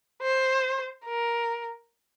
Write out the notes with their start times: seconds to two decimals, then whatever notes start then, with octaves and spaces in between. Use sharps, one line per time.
0.22 C5
1.05 A#4